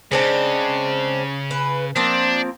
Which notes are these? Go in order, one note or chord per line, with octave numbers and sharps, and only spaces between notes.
C#3 G#3 C4 D4
B4
F3 A#3 C4 D4